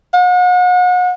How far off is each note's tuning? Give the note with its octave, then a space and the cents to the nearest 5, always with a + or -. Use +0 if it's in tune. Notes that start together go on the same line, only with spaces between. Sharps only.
F#5 -40